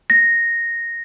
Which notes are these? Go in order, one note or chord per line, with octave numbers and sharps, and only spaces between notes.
A#6